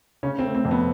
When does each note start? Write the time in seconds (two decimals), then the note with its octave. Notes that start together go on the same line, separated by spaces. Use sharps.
0.23 C#3 C#4
0.39 C4
0.44 A3
0.55 C4
0.65 F2
0.71 B3